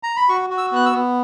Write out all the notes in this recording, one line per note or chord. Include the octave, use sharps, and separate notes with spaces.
A#5
B5
F#4 C#6
F#4
E6
B3 F#6
E6
B3